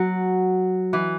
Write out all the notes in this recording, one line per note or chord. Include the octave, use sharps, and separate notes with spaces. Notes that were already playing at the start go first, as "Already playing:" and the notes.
Already playing: F#3
E3